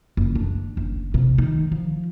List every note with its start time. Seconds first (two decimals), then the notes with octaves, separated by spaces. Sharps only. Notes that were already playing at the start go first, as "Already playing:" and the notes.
0.17 F#1
0.35 D4
0.77 F#1
1.14 C3
1.38 D#3
1.72 F3